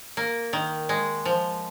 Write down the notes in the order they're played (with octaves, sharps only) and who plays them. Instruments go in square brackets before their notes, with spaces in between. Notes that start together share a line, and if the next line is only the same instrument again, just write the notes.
[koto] A#3
D#3
G#3
F3